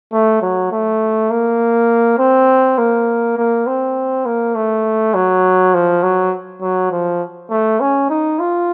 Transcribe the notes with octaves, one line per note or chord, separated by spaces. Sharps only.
A3
F#3
A3
A#3
C4
A#3
A#3
C4
A#3
A3
F#3
F3
F#3
F#3
F3
A3
C#4
D#4
F4